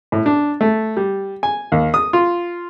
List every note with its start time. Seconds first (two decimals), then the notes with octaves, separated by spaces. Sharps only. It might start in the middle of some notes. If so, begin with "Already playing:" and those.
0.12 A2
0.26 D4
0.61 A3
0.97 G3
1.43 G#5
1.72 D#2
1.94 D#6
2.13 F4